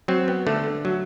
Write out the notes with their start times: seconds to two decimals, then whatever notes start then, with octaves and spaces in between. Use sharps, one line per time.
0.08 F#3 C4
0.28 B3
0.47 D3 A3
0.85 F#3